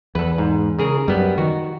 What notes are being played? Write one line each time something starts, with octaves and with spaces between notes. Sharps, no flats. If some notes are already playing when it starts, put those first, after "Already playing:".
E2 A4 B4
G#2
C#3 G#4 A#4
F#2 G3 B3
D#3 F#4